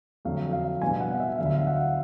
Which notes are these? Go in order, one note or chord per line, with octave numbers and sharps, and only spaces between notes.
F2 D3 F#3 F5
F5
B2 G3 B3 D4 G#5
F#5
F5
E5
D2 D3 F#3 F5
E5
F5
F#5